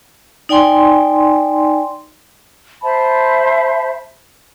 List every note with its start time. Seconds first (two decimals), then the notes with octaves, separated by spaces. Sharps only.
0.49 D#4 D5 G5 G#5 C6
2.82 C5 E5 A5 B5